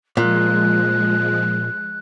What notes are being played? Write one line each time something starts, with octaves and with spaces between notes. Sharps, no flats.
A#2 F3 G#3 F#6